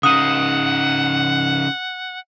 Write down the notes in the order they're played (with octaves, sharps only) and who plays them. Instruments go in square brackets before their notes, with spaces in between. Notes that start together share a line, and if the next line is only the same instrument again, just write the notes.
[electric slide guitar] C#3 D#4 [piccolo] F#5 [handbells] D#6